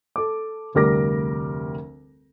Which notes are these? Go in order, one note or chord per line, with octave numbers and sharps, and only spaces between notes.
A4 D6
F1 D2 G3 A#4 D6 A#6